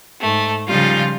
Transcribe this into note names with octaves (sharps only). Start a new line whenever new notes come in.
G#2 A3
C#3 F3 G3 D#4 F4